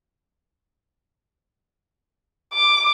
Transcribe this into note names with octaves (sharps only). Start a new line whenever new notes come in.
D6